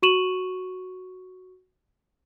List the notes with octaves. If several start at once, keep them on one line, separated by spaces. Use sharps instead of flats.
F#4 C#6 D#7 E7 F#7